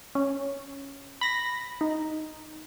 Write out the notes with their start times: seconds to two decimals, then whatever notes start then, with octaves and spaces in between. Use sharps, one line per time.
0.15 C#4
1.21 B5 A#6
1.81 D#4